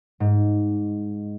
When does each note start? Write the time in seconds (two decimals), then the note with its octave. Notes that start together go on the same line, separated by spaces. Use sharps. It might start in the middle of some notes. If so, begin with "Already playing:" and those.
0.20 G#2